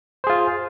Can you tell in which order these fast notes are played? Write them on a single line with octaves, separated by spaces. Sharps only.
C5 G#4 F4